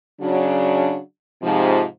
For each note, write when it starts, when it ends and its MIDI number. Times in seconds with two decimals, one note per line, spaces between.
0.21 0.98 49
0.21 0.98 54
0.21 0.98 62
1.42 1.83 44
1.42 1.83 48
1.42 1.83 53